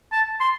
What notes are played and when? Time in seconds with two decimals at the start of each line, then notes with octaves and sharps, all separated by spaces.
0.12 A5
0.40 C6